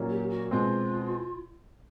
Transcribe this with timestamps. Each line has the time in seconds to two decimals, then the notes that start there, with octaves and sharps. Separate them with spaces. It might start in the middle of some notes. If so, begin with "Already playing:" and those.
Already playing: A#2 F#3 A#3 C#4
0.10 G4
0.30 F#4
0.51 B2 G#3 C4 F4